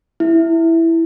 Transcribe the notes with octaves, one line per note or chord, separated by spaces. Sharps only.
E4